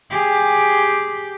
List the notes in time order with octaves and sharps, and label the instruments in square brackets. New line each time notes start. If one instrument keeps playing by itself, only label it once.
[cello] G4 G#4